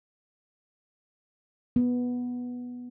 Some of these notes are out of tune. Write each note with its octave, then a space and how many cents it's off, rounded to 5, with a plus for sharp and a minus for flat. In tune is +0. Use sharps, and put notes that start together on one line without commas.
B3 -5